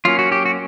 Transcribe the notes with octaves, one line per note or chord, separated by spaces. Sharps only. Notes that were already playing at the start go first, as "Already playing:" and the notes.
F#3 A#3 C#4 F4
F#4
G4
F#4